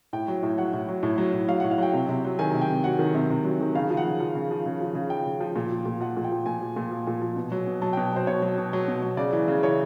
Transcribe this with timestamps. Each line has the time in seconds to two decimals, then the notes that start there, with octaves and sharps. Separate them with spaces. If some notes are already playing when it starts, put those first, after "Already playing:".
0.13 A2 G5
0.28 F#3
0.43 A2
0.58 F#3 F#5
0.73 A2
0.89 F#3
1.03 A2
1.18 F#3
1.33 A2
1.49 F#3 F5
1.60 A2 F#5
1.71 F5
1.78 F#3 G5
1.93 C3
2.09 C3
2.25 F#3
2.39 D#3 G#5
2.54 C3
2.61 G5
2.69 C3
2.84 F#3 F#5
2.99 D#3
3.14 C3
3.30 C3
3.44 F#3
3.60 D#3
3.75 C#3 F5
3.90 F3
3.97 F#5
4.04 C#3
4.20 F3
4.35 C#3
4.51 F3
4.66 C#3
4.81 F3
4.95 C#3
5.10 F3 G5
5.26 C#3
5.41 F3
5.56 A#2
5.71 F3
5.86 A#2
6.00 F3 F#5
6.17 A#2
6.24 G5
6.32 F3
6.46 A#2 G#5
6.61 F3
6.76 A#2
6.91 F3
7.07 A#2
7.22 F3
7.36 B2
7.52 F#3
7.67 B2
7.82 F#3 A5
7.93 B2 G5
8.13 F#3 C5
8.27 B2 C#5
8.42 F#3
8.58 B2
8.73 F#3
8.88 B2
9.03 F#3
9.17 C#3 D5
9.33 E3
9.48 C#3
9.63 E3 C#5